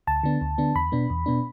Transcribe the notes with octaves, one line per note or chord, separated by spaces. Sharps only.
D2 A5
D3 B3 D4
D2
D3 B3 D4
E2 B5
B2 B3 D4
E2
B2 B3 D4